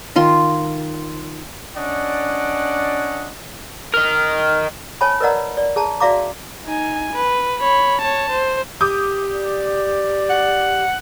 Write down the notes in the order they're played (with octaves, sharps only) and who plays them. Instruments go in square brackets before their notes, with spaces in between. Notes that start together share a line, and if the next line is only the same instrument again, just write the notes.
[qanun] D#3 F4 C6
[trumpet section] C#4 D4 D5 D#5 F#5
[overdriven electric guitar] A#4 D#5 [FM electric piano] F6
[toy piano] C#5 G#5 A5 B5
A#4 B4 D5 D#5 F#5 A#5
D5
G#4 A5 A#5
F#4 D5 E5 F5 A#5 D6
[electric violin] D#4 G#5
B4
C#5 B5
C#5 A5
C5
[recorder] G4 [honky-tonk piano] D6 D#6 G6
[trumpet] D5
[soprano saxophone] F#5